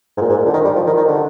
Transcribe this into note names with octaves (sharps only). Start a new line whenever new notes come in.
G#2
A#2
G#2
A#2
D3
D#3
G3
F3
D#3
D#3
D3